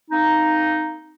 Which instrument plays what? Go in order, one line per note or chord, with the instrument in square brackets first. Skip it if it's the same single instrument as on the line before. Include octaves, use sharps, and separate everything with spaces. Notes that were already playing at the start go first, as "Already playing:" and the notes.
[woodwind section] A#3 C4 D#4